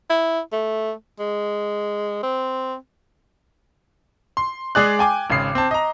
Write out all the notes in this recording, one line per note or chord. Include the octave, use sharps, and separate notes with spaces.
E4
A3
G#3
C4
C6
G#3 G#4 D5 F#6
G5 G#5 D6
G#1 C#3 C7
C4 A5
D#5 A#5